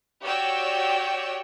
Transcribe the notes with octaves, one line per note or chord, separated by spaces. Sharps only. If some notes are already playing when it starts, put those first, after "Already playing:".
F#4 G4 C#5 D5 G5 E6